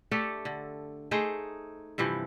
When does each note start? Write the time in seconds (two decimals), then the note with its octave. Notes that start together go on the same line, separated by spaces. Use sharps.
0.11 A3 D4 G4 A4
0.45 D3
1.11 A3 D#4 G#4 C5
1.98 G2 C3 E3 F3